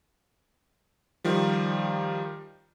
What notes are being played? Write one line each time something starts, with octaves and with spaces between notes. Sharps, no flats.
D#3 F3 G3